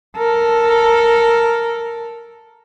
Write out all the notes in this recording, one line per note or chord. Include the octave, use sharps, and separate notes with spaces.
A4 A#4